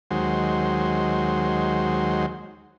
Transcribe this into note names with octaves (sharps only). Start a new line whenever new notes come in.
D#2 F#3 G#3 C5